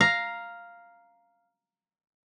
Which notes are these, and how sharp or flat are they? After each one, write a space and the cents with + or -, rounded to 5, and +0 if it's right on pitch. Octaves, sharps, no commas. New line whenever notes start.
F5 +0 A#5 +5